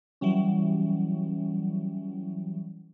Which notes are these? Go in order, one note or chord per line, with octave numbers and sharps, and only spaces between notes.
E3 F#3 G3 C#4